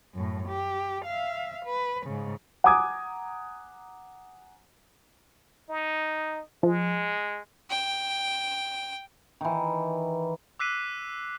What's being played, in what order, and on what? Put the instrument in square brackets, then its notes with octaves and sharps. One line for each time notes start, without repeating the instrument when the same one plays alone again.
[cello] F#2 A2
G4
E5 F5
B4
G#2 C#3
[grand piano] F#5 G#5 A#5 D6 D#6 G#6
[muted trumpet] D#4
[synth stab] F3 [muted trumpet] G#3
[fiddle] G5
[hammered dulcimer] D#3 E3
[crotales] D6 E6 F#6 B6 C7 D#7